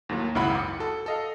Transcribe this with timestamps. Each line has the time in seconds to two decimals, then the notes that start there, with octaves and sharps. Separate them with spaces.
0.09 D#2 A2 F#3 A#3
0.35 G#1 C#2 F#2 E4 F#5 B5
0.55 D6 D#6 C#7
0.79 F#4 A4
1.06 A4 D#5 F5